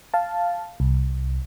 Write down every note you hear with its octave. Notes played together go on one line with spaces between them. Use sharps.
F5 A5
C2